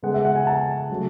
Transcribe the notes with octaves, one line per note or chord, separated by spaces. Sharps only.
C#3 G#3 B3 F#5
E5
F#5
G#5
A5
C#3 F#3 A3